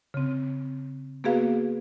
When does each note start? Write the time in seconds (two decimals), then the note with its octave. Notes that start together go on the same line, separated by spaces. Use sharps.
0.14 C#3 C4
1.24 A#3 B3 F#4 G#4 B4 F5